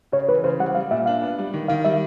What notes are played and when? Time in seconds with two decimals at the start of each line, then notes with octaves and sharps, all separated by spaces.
0.12 C#3 C#5
0.29 E3 B4
0.44 C#3 C5
0.59 G3 F#5
0.75 G3 F5
0.91 A#2 E5
1.06 D4 F5
1.22 B3
1.38 G3
1.53 D#3
1.68 D#3 F5
1.85 G3 E5